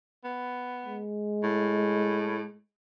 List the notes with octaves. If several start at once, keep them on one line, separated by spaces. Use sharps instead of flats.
B3
G#3
A2